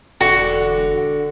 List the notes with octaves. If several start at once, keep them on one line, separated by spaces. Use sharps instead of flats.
E1 D3 F#4